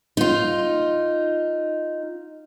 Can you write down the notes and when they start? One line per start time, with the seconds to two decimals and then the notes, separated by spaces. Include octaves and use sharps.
0.17 D#4 F4